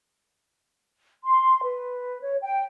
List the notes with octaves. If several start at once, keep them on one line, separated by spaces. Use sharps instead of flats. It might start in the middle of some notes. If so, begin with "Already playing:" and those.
C6
B4
C#5
G5